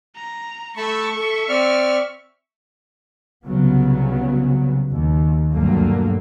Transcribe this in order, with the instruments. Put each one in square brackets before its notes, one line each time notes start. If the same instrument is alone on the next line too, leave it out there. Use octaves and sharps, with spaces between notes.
[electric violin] A#5
[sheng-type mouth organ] A3 A5 B5 [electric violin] E5 C#6
[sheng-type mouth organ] A4
C4 D5 F6
[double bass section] C2 C#3 F#3 B3
D#2
D2 G2 B2 F#3 A3 A#3